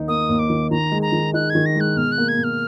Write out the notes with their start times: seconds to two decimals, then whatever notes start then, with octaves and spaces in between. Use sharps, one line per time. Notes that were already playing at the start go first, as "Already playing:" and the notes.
Already playing: D#2 D#3 D#4
0.08 A#3 D#6
0.29 D#2
0.39 D6
0.50 D#3
0.71 D#3 A#5
0.92 G#3
1.02 A#5
1.12 D#3
1.34 D#4 F#6
1.50 D#3 G#6
1.66 A#6
1.75 G#3 F#6
1.96 B2 F6
2.12 F#6
2.18 A#3
2.28 G#6
2.38 B2
2.44 F6